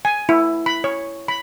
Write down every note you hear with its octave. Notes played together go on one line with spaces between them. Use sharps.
G#5
E4
B5
C#5
B5